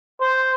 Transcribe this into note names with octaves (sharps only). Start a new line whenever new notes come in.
C5